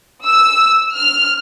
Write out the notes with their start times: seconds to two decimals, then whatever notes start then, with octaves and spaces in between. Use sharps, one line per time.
0.24 E6
0.95 F6